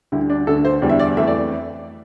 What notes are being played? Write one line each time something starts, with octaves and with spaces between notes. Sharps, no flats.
D2 D3 G3 E4
D4
D2 D3 A3 A4
C5
E2 D3 G3
E5
D5
F2 E3 A3 E5
D5